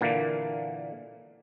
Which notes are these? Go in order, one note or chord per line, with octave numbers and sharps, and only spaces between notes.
A#2 D3 E3 A#3